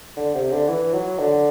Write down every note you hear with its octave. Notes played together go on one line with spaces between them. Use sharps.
D3
C3
D3
E3
F#3
D3